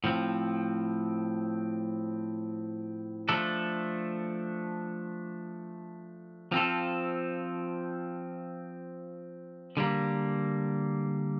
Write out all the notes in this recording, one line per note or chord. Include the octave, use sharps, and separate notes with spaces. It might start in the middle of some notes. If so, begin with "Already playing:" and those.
A2 F3 C4
F3 A3 D4 A4
F3 C4 F4 A4
D3 G3 A#3